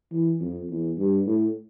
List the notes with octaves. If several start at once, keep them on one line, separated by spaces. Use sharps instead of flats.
E3
F2
E2
G2
A2